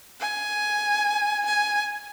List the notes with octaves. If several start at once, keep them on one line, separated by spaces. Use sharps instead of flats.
G#5
G#5